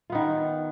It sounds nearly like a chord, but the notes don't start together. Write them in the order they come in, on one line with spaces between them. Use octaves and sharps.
F4 B3 D#3